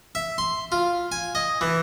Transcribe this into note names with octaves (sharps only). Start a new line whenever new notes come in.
E5
C6
F4
G#5
D#5
E3